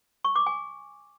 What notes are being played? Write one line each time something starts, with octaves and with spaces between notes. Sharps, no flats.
C#6
D6
G#5